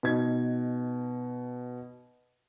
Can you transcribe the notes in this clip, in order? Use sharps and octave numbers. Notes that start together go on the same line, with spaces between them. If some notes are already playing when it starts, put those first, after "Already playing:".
B2 D#4 G#6